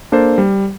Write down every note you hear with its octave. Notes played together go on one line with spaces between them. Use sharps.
A#3 D4 A4 C5
G3